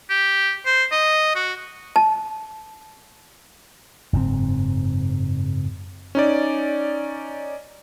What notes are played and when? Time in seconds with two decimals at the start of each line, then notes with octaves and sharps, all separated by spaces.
0.10 G4
0.66 C5
0.92 D#5
1.36 F#4
1.96 A5
4.13 F#1 G#2 B2 C4
6.15 C#4 D#4 D5